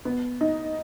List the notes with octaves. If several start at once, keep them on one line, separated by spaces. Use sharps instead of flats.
B3
D#4